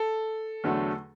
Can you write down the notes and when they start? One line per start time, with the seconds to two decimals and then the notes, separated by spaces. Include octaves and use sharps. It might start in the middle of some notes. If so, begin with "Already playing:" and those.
Already playing: A4
0.64 E2 D3 F#3 A3